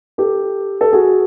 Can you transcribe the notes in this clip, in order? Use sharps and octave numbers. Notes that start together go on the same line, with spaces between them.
G4 A4
A4
F#4 G#4